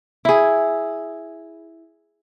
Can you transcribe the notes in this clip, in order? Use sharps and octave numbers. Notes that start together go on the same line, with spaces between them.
E4 G#4